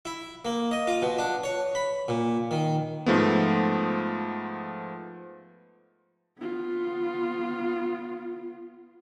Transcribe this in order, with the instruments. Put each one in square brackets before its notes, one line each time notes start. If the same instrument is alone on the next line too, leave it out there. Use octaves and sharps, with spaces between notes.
[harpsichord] E4
A#3
D#5
F4
B2
D4
C#5
B5
A#2
D#3
[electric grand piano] G#2 F3 A3 B3
[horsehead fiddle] B3 F4